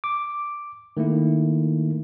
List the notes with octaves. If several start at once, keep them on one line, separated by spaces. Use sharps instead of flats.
D6
D#3 A3 A#3 E4